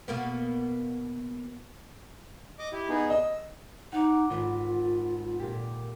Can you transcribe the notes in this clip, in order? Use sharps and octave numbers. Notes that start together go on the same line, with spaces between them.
B2 A#3 B3
D#5 D6
E4 G4
B3 D#4 G#4
D#5 E6
D#4 F#5 D6
G#1 F4
A#2 G4